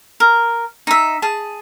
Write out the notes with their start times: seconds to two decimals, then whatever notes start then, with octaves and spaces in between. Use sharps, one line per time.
0.20 A#4
0.87 D#4 E5
1.22 G#4 A5